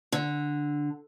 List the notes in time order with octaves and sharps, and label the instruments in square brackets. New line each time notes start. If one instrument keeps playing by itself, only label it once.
[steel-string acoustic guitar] D3